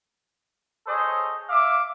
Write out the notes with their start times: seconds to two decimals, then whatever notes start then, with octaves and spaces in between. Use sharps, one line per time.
0.87 G#4 A4 C5 C#5 D#5
1.50 E5 F5 D6